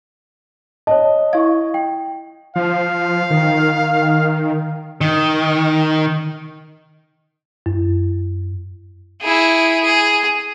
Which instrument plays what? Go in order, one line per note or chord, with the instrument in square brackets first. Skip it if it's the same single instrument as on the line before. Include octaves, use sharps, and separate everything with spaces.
[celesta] C#5 A5 [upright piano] D#5
[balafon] E4 F5 [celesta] C#6 G#6
[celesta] G5
[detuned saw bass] F3 [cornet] F5
[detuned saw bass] D#3
[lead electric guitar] D#3
[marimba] F#2
[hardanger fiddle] E4 G#4
G#4